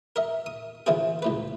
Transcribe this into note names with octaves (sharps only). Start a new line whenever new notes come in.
A#4 D#5 E5
D#6
D3 E3 F3 E4 F4 G#4
C#2 A2 B4